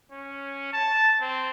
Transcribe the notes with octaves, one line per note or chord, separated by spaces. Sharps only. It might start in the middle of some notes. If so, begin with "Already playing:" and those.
C#4
A5
C4